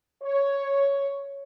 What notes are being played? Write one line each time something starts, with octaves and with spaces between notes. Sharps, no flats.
C#5